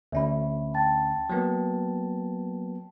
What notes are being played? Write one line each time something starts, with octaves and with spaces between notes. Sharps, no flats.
D2 C#4 E5 B5
G5 A5 A6
F#3 A#3 B3